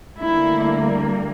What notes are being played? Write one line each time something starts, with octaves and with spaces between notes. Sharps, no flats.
D2 D3 G3 A#3 E4